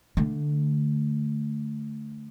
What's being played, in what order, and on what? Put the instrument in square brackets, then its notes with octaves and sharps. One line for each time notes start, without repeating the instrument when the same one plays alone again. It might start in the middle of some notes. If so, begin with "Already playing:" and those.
[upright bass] D3 A3